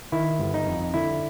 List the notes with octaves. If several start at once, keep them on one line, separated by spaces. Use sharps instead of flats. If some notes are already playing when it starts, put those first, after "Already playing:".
D#3 E4
G1
D#4
F2
D3 E4